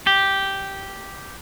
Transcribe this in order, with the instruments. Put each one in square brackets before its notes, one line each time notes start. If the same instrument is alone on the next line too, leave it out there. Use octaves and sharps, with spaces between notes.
[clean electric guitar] G4